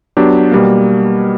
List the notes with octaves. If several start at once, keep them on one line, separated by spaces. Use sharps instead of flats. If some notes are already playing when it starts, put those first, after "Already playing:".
F#3 B3 D4 G4
B2 G3 A#3